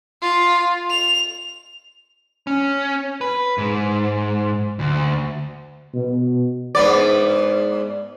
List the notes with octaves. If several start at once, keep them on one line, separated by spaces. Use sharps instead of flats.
F4
F7
C#4
B4
G#2
D2
B2
G#2 B3 D5